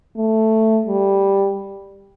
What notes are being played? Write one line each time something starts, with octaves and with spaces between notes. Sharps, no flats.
A3
G3